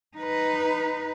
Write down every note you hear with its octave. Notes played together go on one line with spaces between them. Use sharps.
D#4 B4